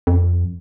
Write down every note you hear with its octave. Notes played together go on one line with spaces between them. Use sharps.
F2